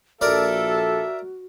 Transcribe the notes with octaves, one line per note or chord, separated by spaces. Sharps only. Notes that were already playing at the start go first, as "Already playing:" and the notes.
A#1 F#4 A4 A#4 D5 E5